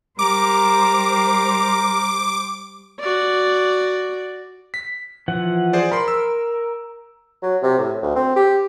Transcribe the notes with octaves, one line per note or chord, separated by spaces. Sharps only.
G3 A#4 C5 A#5 D6
F#4 D5
B6
E3 F3 F#5
G#4 C5 D5
A#4 B5 C6
E6
F#3
C3
A2
D2
C4
G4